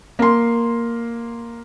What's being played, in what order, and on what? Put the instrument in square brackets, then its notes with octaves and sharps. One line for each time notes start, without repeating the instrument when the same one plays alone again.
[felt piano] A#3 C6